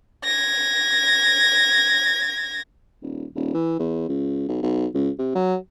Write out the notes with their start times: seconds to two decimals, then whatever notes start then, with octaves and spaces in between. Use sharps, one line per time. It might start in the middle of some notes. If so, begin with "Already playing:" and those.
0.24 G#6 A#6
3.02 D#1
3.35 D#1
3.54 E3
3.79 E2
4.08 C#2
4.48 B1
4.63 B1
4.94 C#2
5.19 C3
5.35 F#3